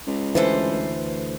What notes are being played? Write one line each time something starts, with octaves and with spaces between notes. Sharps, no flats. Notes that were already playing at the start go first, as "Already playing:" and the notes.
C#2
D2 E3 A4 B4 C5